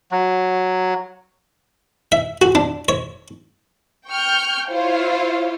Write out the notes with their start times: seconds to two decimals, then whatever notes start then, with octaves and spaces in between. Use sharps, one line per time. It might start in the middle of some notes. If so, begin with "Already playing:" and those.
0.12 F#3
2.12 E5
2.42 F#4
2.55 D4
2.89 C#5
4.09 G5 C#6 F6 G6
4.70 E4 F4 C5 C#5 F5